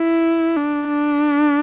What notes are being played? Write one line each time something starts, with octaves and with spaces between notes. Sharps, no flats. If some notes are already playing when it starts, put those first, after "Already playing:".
Already playing: E4
D4
D4